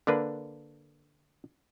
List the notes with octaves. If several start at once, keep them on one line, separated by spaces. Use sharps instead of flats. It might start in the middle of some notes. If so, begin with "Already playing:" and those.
D3 A#3 D4 B4